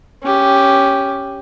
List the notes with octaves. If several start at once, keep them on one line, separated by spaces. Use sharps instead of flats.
C#4 G4